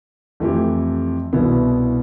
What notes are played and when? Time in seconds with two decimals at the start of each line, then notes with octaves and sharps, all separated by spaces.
0.40 F2 E3 A3 E4 G4
1.33 C2 B2 B3 E4